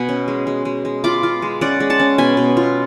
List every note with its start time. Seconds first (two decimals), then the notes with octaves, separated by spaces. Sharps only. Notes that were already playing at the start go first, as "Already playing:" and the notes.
Already playing: B2 B4 F#5 G#5 B5
0.09 C#4
0.28 G#3
0.47 G#3
0.65 G#3
0.85 G#3
1.04 F4 B5 D6
1.23 F4
1.42 G#3
1.61 C#4 D5 F#5
1.80 G#3
1.90 F#5 A5
2.00 C#4
2.18 B2 G#5 B5
2.37 B2
2.57 F4